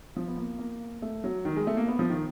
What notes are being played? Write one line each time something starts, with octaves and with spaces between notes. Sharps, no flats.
F3
B3
A#3
A#3
A3
F#3
D#3
G#3
A3
A#3
B3
F3
D#3